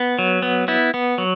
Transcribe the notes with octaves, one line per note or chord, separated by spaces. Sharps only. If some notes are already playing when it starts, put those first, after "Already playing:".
Already playing: B3
F#3
B3
B3 E4
B3
F#3